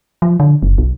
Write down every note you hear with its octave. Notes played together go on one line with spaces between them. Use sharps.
F3
D3
F#1
B1